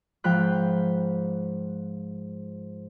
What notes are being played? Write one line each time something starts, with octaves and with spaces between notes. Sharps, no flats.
G#2 F3 F4 G5 B5 F#6